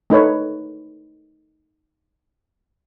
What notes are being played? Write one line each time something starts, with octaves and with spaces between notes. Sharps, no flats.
A3 D#4 B4 C#5